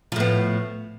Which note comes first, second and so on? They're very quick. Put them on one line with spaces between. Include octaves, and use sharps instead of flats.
F3 A2 B3